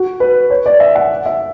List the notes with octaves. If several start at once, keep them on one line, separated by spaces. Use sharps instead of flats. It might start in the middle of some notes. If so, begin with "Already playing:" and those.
Already playing: F#4
B4
C#5
D5
E5
F#5
E5